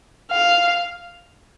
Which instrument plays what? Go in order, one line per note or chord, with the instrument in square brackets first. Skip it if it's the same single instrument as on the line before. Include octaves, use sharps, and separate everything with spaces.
[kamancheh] F5